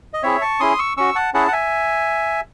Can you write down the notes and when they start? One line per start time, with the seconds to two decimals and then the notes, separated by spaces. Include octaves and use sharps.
0.14 D#5
0.23 C4 E4 G#4 C#5 E5
0.42 A5 C#6
0.60 C#4 E4 G#4 C6 D#6
0.79 C#6 E6
0.97 C#4 F#4 C#6 E6
1.15 F#5 A5
1.34 C#4 E4 G#4 F#5 A5
1.48 F#5
1.53 E5 G#5